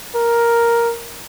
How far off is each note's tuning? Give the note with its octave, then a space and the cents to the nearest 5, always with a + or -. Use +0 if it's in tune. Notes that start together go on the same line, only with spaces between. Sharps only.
A#4 +5